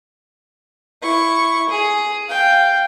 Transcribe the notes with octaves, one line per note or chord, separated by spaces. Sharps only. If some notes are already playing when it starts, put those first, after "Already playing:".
E4 C#6
G#4
F5 G5